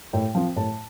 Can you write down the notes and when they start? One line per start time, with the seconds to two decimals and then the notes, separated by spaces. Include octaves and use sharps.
0.13 A2 G5
0.35 F3 C4
0.56 A2 A5